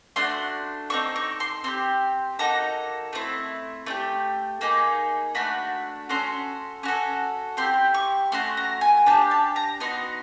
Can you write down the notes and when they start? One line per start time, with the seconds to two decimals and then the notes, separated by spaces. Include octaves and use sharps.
0.16 A3 D4 F#4 C6
0.90 C4 D#4 F#4 A4 C#6
1.16 C#6
1.40 C6
1.64 C4 E4 G4 C6
2.39 A#3 D#4 F#4 A4 A#5
3.13 A3 C4 E4
3.86 A3 D4 G4
4.61 A#3 D#4 G#4 B5
5.35 A3 D4 F#4 B5
6.09 C#4 F#4 A4 C6
6.83 C#4 F#4 A4
7.57 C4 E4 G4 C6
7.94 C#6
8.32 A3 C#4 F#4 C6
8.57 A#5
8.81 G#5
9.06 D4 G4 A5
9.31 A5
9.56 A#5
9.80 B3 D#4 F#4 C6